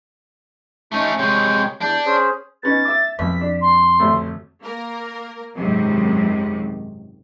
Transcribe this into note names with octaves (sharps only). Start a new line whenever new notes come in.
A3 C#4 D#4
C3 G#3 C#5 G5
E2 D4 G6
C#4 G#4 C5
B3 C#4 D#4 A6
E5 D6
B1 F2 B6
D4
C6
A1 D2 A3
A#3 A#4
G#1 C#2 F#2 C3 D#3 F#3